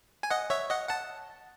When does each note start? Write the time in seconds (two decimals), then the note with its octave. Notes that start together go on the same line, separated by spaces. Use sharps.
0.23 G#5
0.31 D#5 F#5
0.50 C#5 E5
0.70 D#5 F#5
0.89 F#5 A5